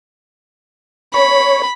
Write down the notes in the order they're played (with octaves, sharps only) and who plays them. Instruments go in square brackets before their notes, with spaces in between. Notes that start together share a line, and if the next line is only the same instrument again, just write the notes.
[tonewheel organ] C#5 [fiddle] B5